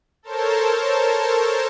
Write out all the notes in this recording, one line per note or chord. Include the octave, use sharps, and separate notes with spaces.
A4 A#4 C5 C#5 A5